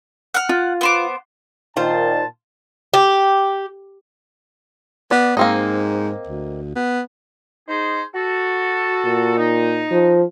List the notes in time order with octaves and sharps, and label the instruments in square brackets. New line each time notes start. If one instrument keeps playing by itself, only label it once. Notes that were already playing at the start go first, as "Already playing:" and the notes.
[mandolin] F#5 F6
[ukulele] F4
[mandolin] B3 C5 D6
[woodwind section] A#2 D#3 [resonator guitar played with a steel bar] F4 C5 [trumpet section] A5
[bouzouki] G4
[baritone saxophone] B3 [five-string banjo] D5
[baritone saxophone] G#2 [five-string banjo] A#3 C4 D#4
[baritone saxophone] D2
B3
[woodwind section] D#4 G#4 C5
F#4 A4
[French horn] A#2
[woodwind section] D#4
[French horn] F3